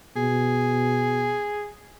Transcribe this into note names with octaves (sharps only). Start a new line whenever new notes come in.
B2 G#4